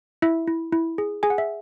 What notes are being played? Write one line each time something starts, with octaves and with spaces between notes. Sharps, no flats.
E4 E5
E4
E4
G#4
G#4 G#5
F#5
E5